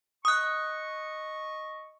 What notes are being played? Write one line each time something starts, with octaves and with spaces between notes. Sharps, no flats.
D#5 C#6 D#6 F#6